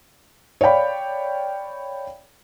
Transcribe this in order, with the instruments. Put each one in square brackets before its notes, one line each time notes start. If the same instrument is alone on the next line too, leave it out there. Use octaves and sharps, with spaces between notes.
[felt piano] C#5 D5 F5 G5 B5